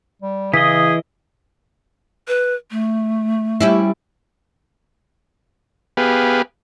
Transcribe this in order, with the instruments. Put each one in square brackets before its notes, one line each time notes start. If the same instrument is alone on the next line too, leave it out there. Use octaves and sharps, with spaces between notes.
[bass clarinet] G3
[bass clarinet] C#3 [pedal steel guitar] E3 D#5 [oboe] G#4 [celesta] B6
[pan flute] B4
A3
[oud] G3 C#4 E4
[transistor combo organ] B3 G4 G#4 B4 F5